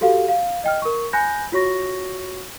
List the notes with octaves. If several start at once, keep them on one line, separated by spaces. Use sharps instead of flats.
F#4 G4 A4 F5
F5
D#5 G5 F6
A#4 C#6
G#5 B5 F#6 G6 A#6
F4 F#4 C#5 C#6 A#6